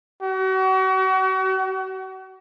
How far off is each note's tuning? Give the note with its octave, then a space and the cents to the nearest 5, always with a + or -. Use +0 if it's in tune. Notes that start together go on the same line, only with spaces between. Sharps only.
F#4 +35